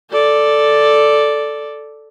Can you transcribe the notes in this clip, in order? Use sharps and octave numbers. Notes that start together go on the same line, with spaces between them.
A4 D5